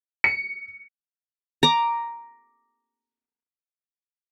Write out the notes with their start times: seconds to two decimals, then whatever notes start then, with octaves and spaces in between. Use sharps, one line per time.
0.24 C#7
1.63 A#5 D6